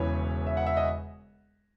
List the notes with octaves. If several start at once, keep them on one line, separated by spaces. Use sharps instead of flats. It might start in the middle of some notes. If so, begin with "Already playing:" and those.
Already playing: E1 E2 C#3 E3 B4 C#5
E5
F#5
E5
D#5